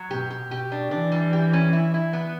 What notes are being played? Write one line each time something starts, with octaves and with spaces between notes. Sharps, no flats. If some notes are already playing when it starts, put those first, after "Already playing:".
Already playing: F#3
B2 G4
G4
B2 G4
D4
E3 D4
G3
G4
C#4
E4
E4
B3